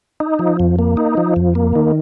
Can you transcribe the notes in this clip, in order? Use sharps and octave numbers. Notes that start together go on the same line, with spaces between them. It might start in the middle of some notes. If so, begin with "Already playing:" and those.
D#4
F3
F2
A#3
D#4
F3
F2
A#3
D#3